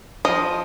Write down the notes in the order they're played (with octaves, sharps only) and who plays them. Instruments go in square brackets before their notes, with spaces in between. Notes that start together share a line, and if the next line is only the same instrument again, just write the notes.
[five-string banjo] F3 D#5